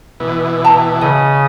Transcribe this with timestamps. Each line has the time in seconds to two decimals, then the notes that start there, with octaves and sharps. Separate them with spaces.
0.20 B2 E3
0.64 G5 A5 A#5
1.01 C#3 D#5 D#6